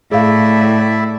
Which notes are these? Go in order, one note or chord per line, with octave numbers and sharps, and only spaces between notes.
A2 E4 G#4 D5 E5 F5